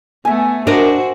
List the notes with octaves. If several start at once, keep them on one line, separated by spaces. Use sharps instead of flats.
A3 B3 E5 G#5
D4 F#4 A#4 C5 D#5